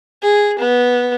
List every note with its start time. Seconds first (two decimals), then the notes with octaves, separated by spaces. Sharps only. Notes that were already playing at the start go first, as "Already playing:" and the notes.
0.22 G#4
0.59 B3